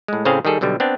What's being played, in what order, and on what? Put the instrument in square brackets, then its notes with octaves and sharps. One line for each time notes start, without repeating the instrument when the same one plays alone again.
[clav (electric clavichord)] A2 G#3
A2 C#3 C4 G#4 C5 F5
D#3 G3 G#4 A4
B1 B2 D3 G3
B3 C4 D4